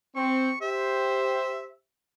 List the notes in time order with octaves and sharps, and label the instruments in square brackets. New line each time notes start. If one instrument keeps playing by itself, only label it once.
[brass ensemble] C4 [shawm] C#6
[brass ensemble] G4 C5 [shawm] E5